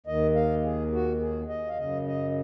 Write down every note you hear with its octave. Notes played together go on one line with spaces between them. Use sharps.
D#2 D#3 D#5
F5
G#4
F#4
G#4
D#5
F5
F#2 C#3 D#5
D#5